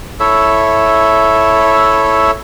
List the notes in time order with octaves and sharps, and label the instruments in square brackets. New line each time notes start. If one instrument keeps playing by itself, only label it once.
[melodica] E4 A4 C#5 E5